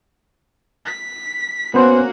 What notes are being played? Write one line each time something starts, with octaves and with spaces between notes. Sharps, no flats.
B6
A#3 B3 C#4 F#4 C5